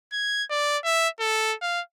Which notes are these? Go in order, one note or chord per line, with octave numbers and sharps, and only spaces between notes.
G#6
D5
E5
A4
F5